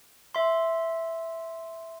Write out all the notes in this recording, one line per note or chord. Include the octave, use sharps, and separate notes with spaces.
E5 C6